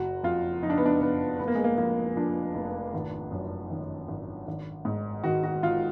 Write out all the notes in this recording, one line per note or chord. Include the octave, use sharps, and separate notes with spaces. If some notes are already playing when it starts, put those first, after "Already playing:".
Already playing: F#1 F#4
F2 F4
F3 D#4
D4
B3
D4
F#1 B3
F1 B3
A#3
G#3
A#3
F2 A#3
F3 D4
F1
G#1
F#2
D#3
G#1
G#1
G#2
D#3 F#4
F#4
G#1 F4